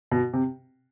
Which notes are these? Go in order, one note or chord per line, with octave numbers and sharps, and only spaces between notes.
B2
C3